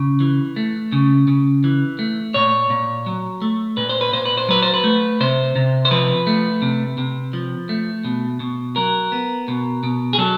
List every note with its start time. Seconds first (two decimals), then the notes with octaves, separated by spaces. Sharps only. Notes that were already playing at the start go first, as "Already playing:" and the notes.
Already playing: C#3
0.20 E3
0.56 A3
0.92 C#3
1.28 C#3
1.64 E3
1.99 A3
2.34 A#2 C#5
2.70 A#2
3.06 F#3
3.42 A3
3.77 A#2 B4
3.89 C5
4.01 B4
4.13 A#2 C5
4.26 B4
4.37 C5
4.48 F#3 B4
4.62 C5
4.74 B4
4.84 A3
5.20 C3 C5
5.56 C3
5.85 C5
5.91 F3 B4
6.27 A3
6.62 C3
6.98 C3
7.33 F3
7.69 A3
8.05 B2
8.40 B2
8.76 F#3 A#4
9.12 B3
9.48 B2
9.83 B2
10.13 G#4
10.18 F#3 A4